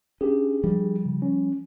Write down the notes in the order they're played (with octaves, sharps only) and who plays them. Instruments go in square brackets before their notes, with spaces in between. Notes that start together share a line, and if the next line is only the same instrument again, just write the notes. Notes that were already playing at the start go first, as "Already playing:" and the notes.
[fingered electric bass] C#4 [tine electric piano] D4 G4 G#4
[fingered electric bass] F3 G3
[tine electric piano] C#3
C#4